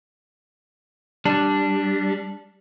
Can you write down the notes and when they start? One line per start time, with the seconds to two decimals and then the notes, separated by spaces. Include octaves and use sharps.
1.25 G3 D4